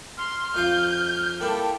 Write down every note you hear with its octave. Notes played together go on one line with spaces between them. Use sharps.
C6 F6
F2 F4 F5 G6
A#3 E4 G4 A4 G5